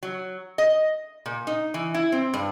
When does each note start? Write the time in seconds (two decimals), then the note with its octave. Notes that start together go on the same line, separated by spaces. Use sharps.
0.03 F#3
0.58 D#5
1.26 A#2
1.47 D#4
1.74 E3
1.94 E4
2.12 C4
2.34 G2